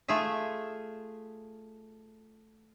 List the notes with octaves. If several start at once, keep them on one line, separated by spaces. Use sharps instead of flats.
A3 F4 G#4 E5